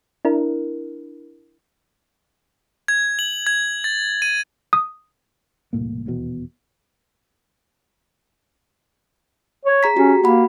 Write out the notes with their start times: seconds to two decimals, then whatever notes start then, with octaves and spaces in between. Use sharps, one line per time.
0.25 D4 E4 A#4
2.88 G#6
3.19 F#7
3.47 G#6
3.84 A6
4.22 D#7
4.73 D#6
5.73 E1 C2 A2 A#3
6.06 D#1 E2 B2
9.65 C#5
9.83 G#4 A#5 B6
9.96 C#4 F#4 G4
10.24 A#3 F#4 F#5 B5